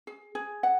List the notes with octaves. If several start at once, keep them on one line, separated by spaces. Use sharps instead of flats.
G#4
G#4
F#5